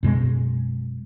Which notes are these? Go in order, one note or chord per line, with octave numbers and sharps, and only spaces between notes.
F#2 B2 G#3